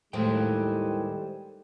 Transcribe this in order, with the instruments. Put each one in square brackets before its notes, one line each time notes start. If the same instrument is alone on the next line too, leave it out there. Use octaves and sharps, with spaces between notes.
[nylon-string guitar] D#2 A2 G#3 [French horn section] D#3 G3 [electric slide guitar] A4 C5 G5